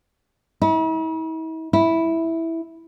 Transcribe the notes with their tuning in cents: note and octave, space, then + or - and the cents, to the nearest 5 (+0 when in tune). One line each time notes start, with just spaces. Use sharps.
E4 -45
E4 -5